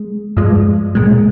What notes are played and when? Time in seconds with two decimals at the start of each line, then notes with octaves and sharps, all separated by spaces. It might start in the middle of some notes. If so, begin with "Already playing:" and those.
Already playing: G#3
0.37 G2 F3 G#3
0.95 C2 A#2 G#3